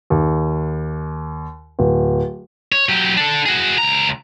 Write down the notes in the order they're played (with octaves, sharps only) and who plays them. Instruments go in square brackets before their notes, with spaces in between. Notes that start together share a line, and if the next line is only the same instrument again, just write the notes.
[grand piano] D#2
D1
[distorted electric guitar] C#5
F#3 G4
D4 A4
F#4 G#4
C#2 A#5